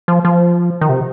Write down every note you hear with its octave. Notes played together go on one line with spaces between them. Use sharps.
F3
F3
D#3
C3